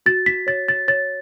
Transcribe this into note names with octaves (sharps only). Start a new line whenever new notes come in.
F#4 A6
B6
C#5 A6
A6
C#5 A6